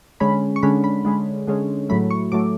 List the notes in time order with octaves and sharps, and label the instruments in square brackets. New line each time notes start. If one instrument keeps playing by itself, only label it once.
[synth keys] D3 G#3 C#4 B5
C#6
D3 G#3 C#4 B5
B5
D3 G#3 C#4
D3 G#3 C#4
A2 F#3 A3 B5
C#6
A2 F#3 A3 D6